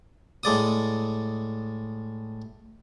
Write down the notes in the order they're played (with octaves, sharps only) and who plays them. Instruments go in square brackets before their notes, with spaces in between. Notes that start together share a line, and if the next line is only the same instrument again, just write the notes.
[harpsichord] A2 G#3 D5 D#6